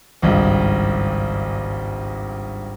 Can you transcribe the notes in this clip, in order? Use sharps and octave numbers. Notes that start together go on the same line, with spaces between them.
G#1 C#2 G2